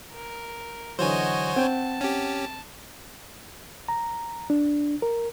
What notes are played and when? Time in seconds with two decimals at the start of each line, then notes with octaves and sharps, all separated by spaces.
0.12 A#4
0.99 D3 E3 F#3 F#4 C5 C#5 D#5 G#5
1.56 C4 F#5 G5 A5
2.01 C#4 G4
3.88 A#5
4.50 D4
5.02 A#4